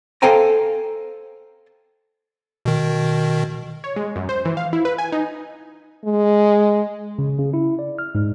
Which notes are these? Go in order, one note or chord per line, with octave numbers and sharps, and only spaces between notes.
A4 C5 F5 G5 G#5 A#5
B2 D#3
C#5
G#3
F#2
C5
E3
F5
E4
B4
G#5
D#4
G#3
C#3
C#3
E4
D5
F6
G#2